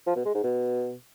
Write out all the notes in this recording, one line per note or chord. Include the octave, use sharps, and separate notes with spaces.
F3
B2
G#3
G#2
B2